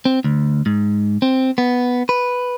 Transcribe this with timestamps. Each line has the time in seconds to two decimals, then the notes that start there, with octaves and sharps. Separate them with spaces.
0.05 C4
0.24 D2
0.66 G#2
1.22 C4
1.58 B3
2.09 B4